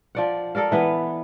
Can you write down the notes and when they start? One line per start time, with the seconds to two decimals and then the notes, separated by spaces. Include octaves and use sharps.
0.15 F3 D5 F#5
0.55 A4 A#4 D5 F5
0.72 E3 B3 B4